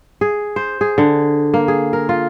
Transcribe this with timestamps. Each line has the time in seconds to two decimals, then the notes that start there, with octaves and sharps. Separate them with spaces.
0.21 G#4
0.56 C5
0.81 G#4
0.98 D3
1.54 A#3
1.68 G#4
1.93 A#4
2.09 F4